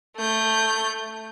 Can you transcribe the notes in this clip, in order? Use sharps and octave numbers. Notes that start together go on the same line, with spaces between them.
A3 G6